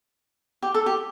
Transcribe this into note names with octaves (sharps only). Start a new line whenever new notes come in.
G4
A4
G4